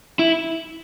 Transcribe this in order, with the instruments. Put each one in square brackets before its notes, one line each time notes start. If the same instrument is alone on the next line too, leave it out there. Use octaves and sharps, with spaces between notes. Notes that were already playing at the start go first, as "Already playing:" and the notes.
[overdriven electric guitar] E4